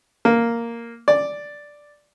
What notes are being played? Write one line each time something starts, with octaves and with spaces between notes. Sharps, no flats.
A#3
D5